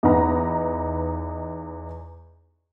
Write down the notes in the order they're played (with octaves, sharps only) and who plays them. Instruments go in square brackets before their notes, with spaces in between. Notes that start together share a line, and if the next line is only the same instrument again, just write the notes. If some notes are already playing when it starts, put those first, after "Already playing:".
[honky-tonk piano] E2 D#4 B4 A#5